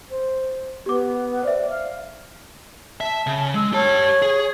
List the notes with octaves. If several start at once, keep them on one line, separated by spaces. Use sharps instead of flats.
C5
B3 G4 D6
C5 D5 E5
F5
E5 A5
C#3
G#3 E6
G4 C#5 A5
G#4